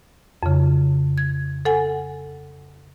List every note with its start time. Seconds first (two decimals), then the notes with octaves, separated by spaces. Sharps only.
0.43 F2 C#3
1.18 G#6
1.65 A4 F#5 G#5